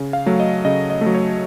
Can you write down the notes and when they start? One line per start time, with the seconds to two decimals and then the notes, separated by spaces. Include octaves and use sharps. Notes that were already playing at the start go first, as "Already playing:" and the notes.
Already playing: C#3
0.13 F5
0.26 F#3 A3
0.40 D#5
0.65 C#3 D#5
0.90 D#5
1.01 A3
1.06 F#3
1.15 C#5